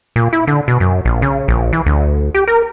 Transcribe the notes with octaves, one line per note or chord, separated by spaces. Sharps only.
A#2
E4
D3
B2
F#2
A#1
C#3
A#1
E3
D2
G4
A#4